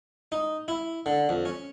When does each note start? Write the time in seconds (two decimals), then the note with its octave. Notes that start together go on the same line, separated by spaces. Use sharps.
0.32 D#4
0.68 E4
1.06 D3
1.29 F2
1.45 C#4